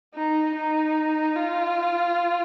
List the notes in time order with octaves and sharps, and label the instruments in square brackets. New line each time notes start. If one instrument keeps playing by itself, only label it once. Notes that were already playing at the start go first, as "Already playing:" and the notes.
[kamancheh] D#4
D#4
F4